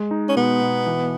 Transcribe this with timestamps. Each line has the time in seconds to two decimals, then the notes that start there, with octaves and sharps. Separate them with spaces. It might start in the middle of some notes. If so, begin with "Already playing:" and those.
Already playing: G#3
0.11 D#4
0.29 C#4
0.36 B2 B3
0.61 B2
0.87 E3